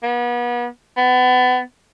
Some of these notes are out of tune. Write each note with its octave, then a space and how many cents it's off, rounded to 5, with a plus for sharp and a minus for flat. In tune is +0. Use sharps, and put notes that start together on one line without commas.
B3 -35
B3 +30